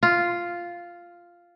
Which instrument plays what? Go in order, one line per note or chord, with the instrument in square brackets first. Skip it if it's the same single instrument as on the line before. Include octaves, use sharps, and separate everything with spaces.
[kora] F4